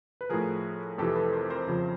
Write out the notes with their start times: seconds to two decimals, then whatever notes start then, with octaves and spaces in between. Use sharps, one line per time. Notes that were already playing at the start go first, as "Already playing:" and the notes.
0.21 B4
0.30 A2 F3 G#4 A#4
0.98 F2 C3 E3 G4 A4
1.16 A4 B4
1.33 A#4 C5
1.50 A#4 C5
1.67 F2 C#3 F3